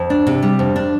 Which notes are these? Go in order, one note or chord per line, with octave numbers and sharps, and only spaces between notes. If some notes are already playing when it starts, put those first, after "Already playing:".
Already playing: F2
D4
C3
G3
F2
D4